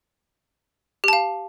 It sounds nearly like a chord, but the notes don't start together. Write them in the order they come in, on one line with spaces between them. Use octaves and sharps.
G4 A5 F5